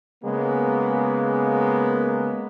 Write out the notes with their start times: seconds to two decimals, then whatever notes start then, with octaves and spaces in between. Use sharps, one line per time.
0.24 C#3 G#3 A#3 B3